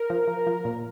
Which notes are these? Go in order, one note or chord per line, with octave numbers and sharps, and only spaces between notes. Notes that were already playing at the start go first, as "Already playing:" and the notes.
Already playing: A#4
F3
F3
F3
A#2